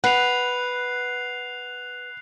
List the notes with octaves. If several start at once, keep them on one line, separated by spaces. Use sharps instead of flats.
B4 F#5 F#6 C7 F7